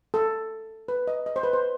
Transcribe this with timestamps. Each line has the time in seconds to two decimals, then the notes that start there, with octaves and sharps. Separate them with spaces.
0.14 A4
0.88 B4
1.07 D#5
1.26 D#5
1.36 C5
1.43 B4
1.53 C5